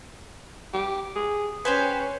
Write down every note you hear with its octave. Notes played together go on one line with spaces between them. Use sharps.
G4
G#4
C#4 G4 B4 C5 G#5